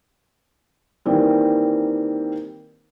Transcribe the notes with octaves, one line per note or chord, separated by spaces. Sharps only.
D#3 E3 G3 A#3 C4